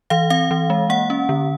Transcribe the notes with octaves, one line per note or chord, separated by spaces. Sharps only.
E3 F5
C4 F5
E3
G#3
A#3 F#5
C#4
D3